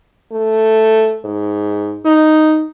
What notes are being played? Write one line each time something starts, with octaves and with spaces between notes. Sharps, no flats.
A3
G#2
D#4